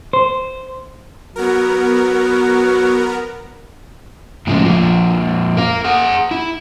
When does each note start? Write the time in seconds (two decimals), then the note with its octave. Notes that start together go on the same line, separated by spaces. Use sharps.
0.13 C5
1.36 F#3 B3 A#4
4.47 A2 C#3 F3 G#3
4.65 F2 A#2 F3
5.57 A#4 F5
5.84 G#4 F#5
6.31 E4